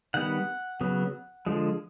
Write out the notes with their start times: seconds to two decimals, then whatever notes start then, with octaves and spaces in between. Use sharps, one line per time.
0.14 D#3 G3 B3 F#5
0.81 C#3 F#3 B3
1.46 D3 F3 G#3